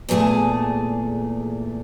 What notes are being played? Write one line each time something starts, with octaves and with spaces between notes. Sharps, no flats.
E2 A#2 A3 G#4 A5